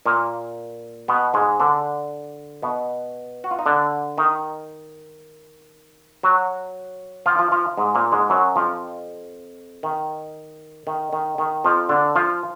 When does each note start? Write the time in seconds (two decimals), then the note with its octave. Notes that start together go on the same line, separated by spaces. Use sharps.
0.06 A#2 A#3
1.08 B2 B3
1.34 G#2 G#3
1.60 D3 D4
2.62 B2 B3
3.44 F#4
3.51 F4
3.59 D#4
3.66 D3 D4
4.18 D#3 D#4
6.23 F#3 F#4
7.26 F3 F4
7.39 F3 F4
7.52 F3 F4
7.77 G#2 G#3
7.95 A#2 A#3
8.12 G#2 G#3
8.30 F#2 F#3
8.56 F2 F3
9.83 D#3
10.87 D#3
11.13 D#3
11.38 D#3
11.64 F2 F3
11.89 D3 D4
12.16 F3 F4